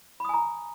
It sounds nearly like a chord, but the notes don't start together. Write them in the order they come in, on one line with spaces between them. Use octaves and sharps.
B5 D#6 G#5 A#5